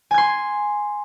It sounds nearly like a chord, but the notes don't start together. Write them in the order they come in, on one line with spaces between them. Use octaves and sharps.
G#5 G#6 C6